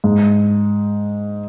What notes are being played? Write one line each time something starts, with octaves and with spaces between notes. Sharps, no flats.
G#2